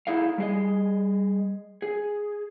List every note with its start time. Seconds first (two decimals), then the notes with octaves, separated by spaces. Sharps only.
0.07 D#4 E4 G#4 A4 F5
0.38 G3 G#4 D#5
1.82 G#4